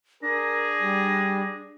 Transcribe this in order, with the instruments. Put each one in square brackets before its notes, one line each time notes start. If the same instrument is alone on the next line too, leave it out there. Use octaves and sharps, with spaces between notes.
[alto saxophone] D4 [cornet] G#4 [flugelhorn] A#4 [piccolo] A#6
[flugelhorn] G3